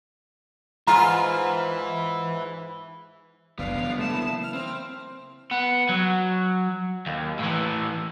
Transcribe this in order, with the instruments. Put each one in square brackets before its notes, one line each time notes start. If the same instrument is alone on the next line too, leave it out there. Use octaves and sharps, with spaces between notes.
[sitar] G#2 F4 [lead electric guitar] E4 B4 [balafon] A#5
[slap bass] F#1 D2 [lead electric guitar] B3 D4 [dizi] F5
[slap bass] C#3 E3 F#3
[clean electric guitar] A3 [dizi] A5
[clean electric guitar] A#3 E4
[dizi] F6
[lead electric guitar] C4 [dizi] F6
[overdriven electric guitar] B3
F#3
D#2
A2 E3